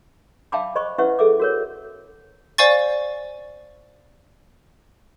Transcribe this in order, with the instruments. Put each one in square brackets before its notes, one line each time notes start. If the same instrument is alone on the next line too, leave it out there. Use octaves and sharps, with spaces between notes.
[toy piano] E5 F5 G5 A5 B5 D6
C5 D#5 B5 C#6
C#4 E4 B4 E5 F#5 C#6
G#4 A4 E5 D6
F#4 A#4 C#5
[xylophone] C5 D5 F5 G#5 C#6 A6